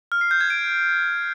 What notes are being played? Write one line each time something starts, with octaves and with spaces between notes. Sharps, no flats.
F6
C7
G6
G#6
D7